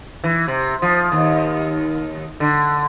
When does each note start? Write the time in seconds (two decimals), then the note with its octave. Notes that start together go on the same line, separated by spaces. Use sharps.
0.24 E3
0.48 C3
0.82 F3
1.12 D#2
2.40 D3